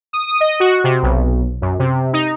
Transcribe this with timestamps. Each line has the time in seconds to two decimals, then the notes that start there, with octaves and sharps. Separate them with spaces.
0.13 D#6
0.40 D#5
0.60 F#4
0.84 C3
1.03 B1
1.62 F#2
1.79 C3
2.13 D#4